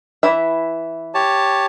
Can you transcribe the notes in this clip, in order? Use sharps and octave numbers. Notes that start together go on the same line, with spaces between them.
E3 E4 E5
G4 C#5 A5